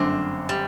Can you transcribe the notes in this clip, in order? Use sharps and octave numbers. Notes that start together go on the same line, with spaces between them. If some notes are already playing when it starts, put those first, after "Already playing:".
Already playing: G1 F#2 D3 A3 C4 D4
G3